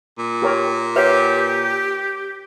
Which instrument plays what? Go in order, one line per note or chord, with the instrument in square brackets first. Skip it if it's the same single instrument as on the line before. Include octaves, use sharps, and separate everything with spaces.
[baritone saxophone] A#2
[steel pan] G4 A#4 C#5
[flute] G4 [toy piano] B4 C#5 F#5 [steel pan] E5